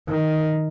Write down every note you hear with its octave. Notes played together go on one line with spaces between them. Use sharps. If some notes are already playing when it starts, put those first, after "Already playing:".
D#3